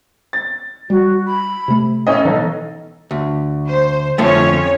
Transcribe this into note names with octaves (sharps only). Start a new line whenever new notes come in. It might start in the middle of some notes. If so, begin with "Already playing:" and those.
A6
G3 F#4
B5
C3 A3
A1 C#4 A4 D#5
B1 E3 D#4
D2
C5
F2 D3 F3 A3 C#4 C#5